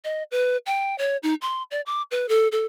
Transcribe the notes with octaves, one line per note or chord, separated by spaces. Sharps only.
D#5
B4
G5
C#5
D#4
C6
D5
D6
B4
A4
A4